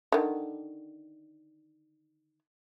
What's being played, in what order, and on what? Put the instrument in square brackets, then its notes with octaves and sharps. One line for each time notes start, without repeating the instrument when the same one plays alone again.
[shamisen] D3 D#3